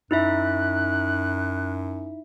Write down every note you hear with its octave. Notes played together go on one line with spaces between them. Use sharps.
F#2 D#4 E4 E5 F#6